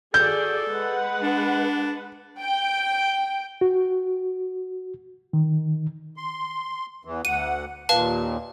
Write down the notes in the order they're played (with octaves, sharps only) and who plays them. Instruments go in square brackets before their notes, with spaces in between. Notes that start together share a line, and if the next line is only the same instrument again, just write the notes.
[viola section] F#4 G#4 D5 [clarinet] A4 [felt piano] G6
[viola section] G#3 B4 F#5
[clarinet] D4
[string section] G5
[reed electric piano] F#4
D#3
[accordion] C6
E2 E3
[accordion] D2 F#5 [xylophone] D#7
[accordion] D#2 A#2 [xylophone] B4 F5 A5